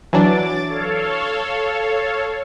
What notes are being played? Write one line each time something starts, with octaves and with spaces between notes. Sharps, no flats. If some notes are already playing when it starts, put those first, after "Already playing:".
E3 F#3 D4 D6 A6
A4 C#5 F5